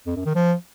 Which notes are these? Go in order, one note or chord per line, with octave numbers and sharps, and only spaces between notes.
F2
F#2
D#3
F3